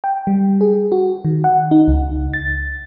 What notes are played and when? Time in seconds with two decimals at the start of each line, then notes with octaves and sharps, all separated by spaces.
0.04 G5
0.27 G3
0.61 G#4
0.92 F#4
1.25 D#3
1.44 F#5
1.71 D#4
1.88 C#2
2.33 A6